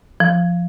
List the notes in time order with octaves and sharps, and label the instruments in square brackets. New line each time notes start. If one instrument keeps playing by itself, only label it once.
[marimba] F3